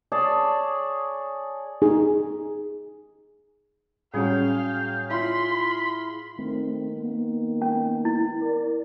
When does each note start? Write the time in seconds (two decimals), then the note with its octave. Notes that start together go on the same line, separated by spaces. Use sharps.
0.12 G#4 C#5 D5 A5
1.82 D#4 G#4
4.14 A2 F#3 G3 C#4 G#4 F5 G5
5.10 E4 F4 B5 C6
6.39 D#3 A3 C4
6.97 A#3 B3
7.62 C#4
8.05 E4
8.41 A#4 D5